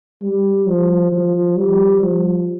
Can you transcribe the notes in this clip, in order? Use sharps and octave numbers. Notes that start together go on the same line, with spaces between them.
G3
F3
F3
G3
F3